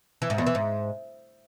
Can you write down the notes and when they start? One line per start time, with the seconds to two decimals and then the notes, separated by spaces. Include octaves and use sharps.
0.22 E3
0.30 G#2
0.38 E2
0.47 E3
0.55 G#2